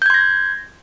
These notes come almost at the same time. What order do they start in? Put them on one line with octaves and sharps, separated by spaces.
G6 G#6 C6 A#6